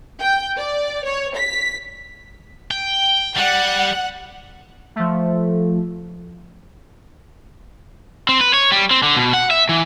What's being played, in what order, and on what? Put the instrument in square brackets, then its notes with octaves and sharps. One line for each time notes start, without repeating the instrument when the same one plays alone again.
[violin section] G5
D5
C#5
B6
[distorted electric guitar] G5
[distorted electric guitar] G3 [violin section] F#5
[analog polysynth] F3 A3
[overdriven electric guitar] C4
B4
C#5
G3
C4
D3
B2
F#5
E5
E3